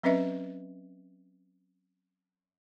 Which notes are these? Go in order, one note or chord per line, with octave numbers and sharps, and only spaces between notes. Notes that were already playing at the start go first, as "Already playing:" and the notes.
F#3 C4 C#4 B4 D#5 E5